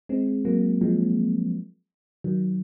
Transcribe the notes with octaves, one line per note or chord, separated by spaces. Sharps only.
G#3 C4
F#3 A#3
F3 G#3
D#3 F#3